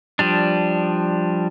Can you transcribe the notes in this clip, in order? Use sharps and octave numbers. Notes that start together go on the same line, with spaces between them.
F3 G3 D4